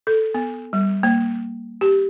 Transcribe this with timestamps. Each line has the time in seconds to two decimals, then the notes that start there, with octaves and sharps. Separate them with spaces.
0.07 A4
0.34 B3
0.73 G3
1.03 A#3
1.81 G4